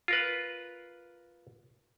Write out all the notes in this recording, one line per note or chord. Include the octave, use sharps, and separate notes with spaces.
F4 A#4 B4